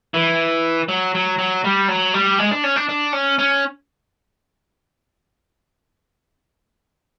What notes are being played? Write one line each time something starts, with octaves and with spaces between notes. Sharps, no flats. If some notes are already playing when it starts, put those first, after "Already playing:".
E3
F#3
F#3
F#3
G3
F#3
G3
G#3
D4
C#4
D4
D4
C#4
C#4